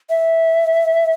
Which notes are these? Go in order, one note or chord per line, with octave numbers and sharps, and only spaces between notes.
E5